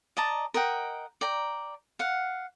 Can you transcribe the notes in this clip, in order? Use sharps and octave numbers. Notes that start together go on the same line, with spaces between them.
D5 D#5 A5 A#5
A#4 D#5 F#5 G5
D5 G5 A#5
F5 F#5